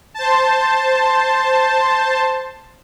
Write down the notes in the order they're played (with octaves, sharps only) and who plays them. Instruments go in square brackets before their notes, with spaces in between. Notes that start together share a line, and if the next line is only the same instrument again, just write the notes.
[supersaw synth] C5 A5